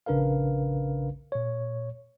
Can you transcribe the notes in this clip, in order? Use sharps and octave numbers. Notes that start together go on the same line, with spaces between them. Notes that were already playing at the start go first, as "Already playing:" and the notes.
A#1 C#3 D4 A#4 B4 F5
A#2 C#5